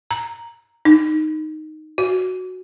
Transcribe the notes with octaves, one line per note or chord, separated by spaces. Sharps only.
A#5
D#4
F#4